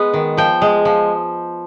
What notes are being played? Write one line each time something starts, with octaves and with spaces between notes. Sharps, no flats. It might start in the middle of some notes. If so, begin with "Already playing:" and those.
Already playing: G#3 B3
D#3
F3 G5
G#3
F3